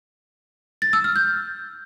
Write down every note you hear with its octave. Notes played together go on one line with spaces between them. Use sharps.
A6
E6
F6
G6